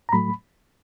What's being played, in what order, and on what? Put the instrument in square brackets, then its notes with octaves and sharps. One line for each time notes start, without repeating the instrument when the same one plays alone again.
[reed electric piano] A#5
A2 F#3 A3 B5